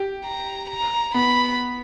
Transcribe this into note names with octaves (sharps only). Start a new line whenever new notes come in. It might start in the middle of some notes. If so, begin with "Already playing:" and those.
Already playing: G4
A#5
A#5
B3 B5